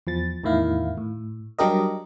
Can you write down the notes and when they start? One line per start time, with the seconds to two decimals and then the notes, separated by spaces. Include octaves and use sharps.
0.07 E2 F3 A6
0.44 E2 A2 D#3 E4 F5
0.97 A2
1.59 F#3 G3 D4 G4 A#4 D#5